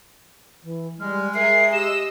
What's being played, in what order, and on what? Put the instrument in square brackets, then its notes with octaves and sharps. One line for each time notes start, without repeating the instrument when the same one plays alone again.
[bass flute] E3
[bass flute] G3 [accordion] G#3 [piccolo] F6
[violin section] G#4 A#4 [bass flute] E5 [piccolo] C7
[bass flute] G4 [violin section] D#5 E6 [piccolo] E7